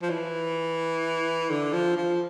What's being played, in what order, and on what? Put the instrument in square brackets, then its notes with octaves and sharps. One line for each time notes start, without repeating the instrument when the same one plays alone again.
[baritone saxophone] F3
E3
D3
F3
F3